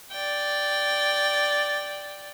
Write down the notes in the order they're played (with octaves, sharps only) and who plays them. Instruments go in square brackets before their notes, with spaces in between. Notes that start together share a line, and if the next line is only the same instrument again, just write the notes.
[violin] D5 G5